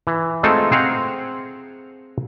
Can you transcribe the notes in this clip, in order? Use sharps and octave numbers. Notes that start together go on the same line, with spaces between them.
E3
G#3 A3 C4 D#4 F4 A4
C4 G#4 C5 F5 F#5 A#5